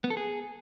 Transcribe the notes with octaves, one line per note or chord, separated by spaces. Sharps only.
B3
A4
G#4